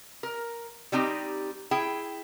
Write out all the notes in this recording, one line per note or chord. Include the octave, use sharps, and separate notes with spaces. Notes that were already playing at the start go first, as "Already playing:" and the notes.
A#4
G3 C4 D#4 G4
E4 G#4 G5